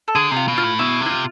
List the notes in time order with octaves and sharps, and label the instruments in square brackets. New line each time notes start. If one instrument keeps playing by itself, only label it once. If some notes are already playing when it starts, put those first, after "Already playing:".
[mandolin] A4
[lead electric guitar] D3 [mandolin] G#4
[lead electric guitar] C3 [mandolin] G#4
[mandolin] F4
[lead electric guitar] B2
[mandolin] F4
[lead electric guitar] A2
[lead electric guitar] B2 [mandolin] E4
[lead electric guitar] C3 [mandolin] E4
[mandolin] F4